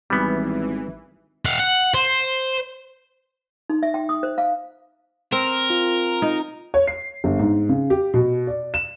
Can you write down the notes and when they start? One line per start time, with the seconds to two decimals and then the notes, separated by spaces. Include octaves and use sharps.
0.10 G#1 E3 G3 B3
1.45 F5 F#5
1.59 F#5
1.94 C5
3.70 D#4
3.83 E5
3.94 G5
4.09 D#6
4.23 C5
4.38 F5
5.32 C4 A#4
5.70 F4
6.22 D#4
6.74 C#5
6.87 C7
7.24 G1
7.39 G#2
7.69 C#3
7.90 G4
8.14 B2
8.47 D5
8.74 E7